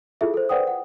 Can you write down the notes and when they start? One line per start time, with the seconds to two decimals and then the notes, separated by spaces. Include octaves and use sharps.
0.21 E4 F4 G#4 A4 E5
0.34 A4 C5
0.49 B4 C5 D5 F#5 G5 D#6
0.67 F#5